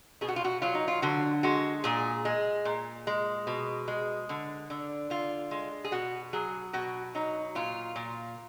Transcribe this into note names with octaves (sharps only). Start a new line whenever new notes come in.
B2 G#4
F#4
F4
F#4
F#3 F4
D#4
F4
D3 F#4
G#3 F#4
A#2 G#4
G#3
A#2
G#3
B2
G#3
D3
D3
D3 F4
G#3
G#4
B2 F#4
F#3 G#4
B2 F#4
F#3 D#4
A#2 F4
A#2